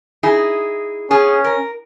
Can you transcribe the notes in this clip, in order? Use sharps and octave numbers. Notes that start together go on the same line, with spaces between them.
D#4 E4 G#4
B3 C#4 G#4
A#4